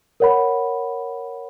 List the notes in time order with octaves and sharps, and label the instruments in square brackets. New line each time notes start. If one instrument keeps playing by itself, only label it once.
[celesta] A#4 C#5 F#5 B5